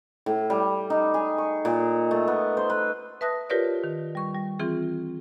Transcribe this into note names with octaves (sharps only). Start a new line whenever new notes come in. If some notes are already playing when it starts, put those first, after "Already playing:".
A2
G3
D#4
G#4
C#6
A#2
A3
B3
C5
B4
B4 E5 A5 D#6 F#6 A#6
F4 G4 A#4 B4 C#5 D5
D#3
G3 C#6
G3
E3 C4 F4 G#4